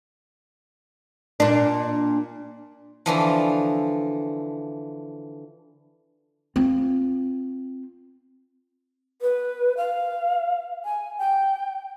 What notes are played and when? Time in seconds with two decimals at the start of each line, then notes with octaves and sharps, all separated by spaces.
1.40 A#2 D4
3.06 D3 E3 F3
6.56 C4 F4
9.22 B4
9.77 F5
10.85 G#5
11.18 G5